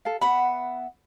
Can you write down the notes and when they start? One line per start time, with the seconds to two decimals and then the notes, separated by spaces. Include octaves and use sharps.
0.05 A4 F5
0.21 B3 E5 F#5 B5